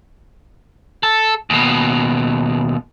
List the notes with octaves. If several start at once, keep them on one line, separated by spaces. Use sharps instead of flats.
A4
D#2 B2